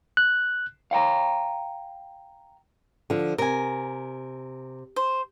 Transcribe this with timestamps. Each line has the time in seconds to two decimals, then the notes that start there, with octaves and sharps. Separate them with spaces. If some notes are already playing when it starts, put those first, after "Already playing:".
0.17 F#6
0.91 F5 G5 A#5
3.10 D3 F3
3.38 C3 A#4 G#5
4.96 C5